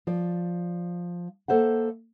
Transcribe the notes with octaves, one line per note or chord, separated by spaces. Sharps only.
F3 D5
A#3 A4 C5 E5 F#5